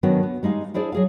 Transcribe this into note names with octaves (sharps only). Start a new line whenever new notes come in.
D#3 F#3 B3 C#4 D4 F#4
B3
G3 G#3 D#4 F5
D4 E4 G#4 C5 D5
F#3 G#4 F5